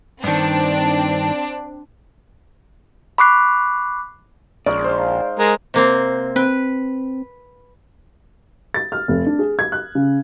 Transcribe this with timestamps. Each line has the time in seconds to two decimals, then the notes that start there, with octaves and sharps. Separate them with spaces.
0.24 G2 D#3 C4 D4
3.18 B5 C#6 D6 F#6 C7
4.66 A#1 G#3 C#4 D#4 D5
4.84 C5 F5
5.39 G#3 A#4
5.74 C3 A#3 C4
6.36 C4 B4
8.74 A6
8.92 F6
9.08 F1
9.26 D4
9.39 G#4
9.59 G#6
9.72 F#6
9.95 C#3